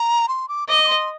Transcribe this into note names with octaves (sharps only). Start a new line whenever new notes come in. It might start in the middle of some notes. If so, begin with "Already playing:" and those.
Already playing: A#5
C6
D6
D#5 D6
D6
C6